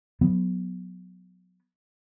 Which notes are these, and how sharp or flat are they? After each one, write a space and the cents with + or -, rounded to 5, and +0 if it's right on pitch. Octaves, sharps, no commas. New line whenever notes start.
F#3 -20 B3 +0